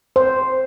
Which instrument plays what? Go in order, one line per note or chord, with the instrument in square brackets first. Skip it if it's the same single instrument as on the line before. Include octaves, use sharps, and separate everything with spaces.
[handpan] C5